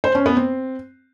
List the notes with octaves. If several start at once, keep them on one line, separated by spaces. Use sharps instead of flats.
C5
C#4
B3
C4